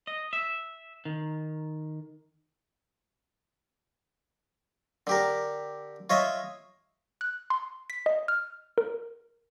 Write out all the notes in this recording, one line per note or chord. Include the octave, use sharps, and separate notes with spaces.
D#5
E5
D#3
D3 G4 A#4
F4 C#5 D#5 E5
F#6
C6
B6
D#5
F6
A#4